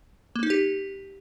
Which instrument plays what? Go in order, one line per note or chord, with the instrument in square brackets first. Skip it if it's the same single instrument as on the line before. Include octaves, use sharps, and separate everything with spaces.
[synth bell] A#3
D#4
G4